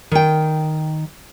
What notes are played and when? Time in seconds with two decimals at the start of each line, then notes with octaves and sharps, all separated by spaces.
0.11 D#3 G5